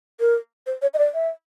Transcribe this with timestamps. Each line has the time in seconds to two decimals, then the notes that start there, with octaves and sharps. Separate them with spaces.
0.20 A#4
0.67 C5
0.82 C#5
0.94 D#5
0.98 D5
1.14 E5